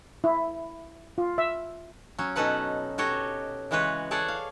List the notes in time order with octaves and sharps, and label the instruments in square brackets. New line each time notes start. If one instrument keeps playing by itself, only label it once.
[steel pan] E4
F4
E5
[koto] F#3 C#4
B2 C#4 D#4 A4 B4 F#5
F#4 G4 A4 C#5 D#5
C#3 E3 G#3 F#4 B4 C#5
G#4 A4 C#5 D5 F#5 G#5
F5